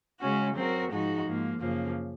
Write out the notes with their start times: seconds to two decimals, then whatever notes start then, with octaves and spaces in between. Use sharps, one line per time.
0.19 C#3 G#3 C#4 F#4
0.54 F#3 C4 F#4 A#4
0.90 G#2 F3 G#3 D#4 F#4
1.25 G#2 F3 A#3
1.60 F#2 C#3 F3 A#3